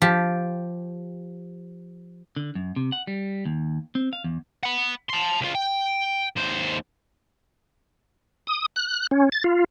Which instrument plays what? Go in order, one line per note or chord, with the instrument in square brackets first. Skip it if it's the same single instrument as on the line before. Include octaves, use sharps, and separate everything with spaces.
[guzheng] F3 G4
[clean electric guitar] D3
F#2
C3
F#5
G3
D#2
C4
F5
E2
[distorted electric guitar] F#5 B5
A5 C6
C#2 F4
G5
D#2 C5
[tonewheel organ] D#6
F#6
C#4
A6
F4